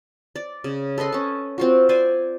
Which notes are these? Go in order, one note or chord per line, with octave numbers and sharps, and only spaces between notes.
D5
C#3
A4 B4 D#5 C6
C#4 A5
C4 F4 F#4
C5 D5 G#5